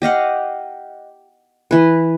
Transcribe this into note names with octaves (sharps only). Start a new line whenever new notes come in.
G4 D#5 F5 F#5
E3 B4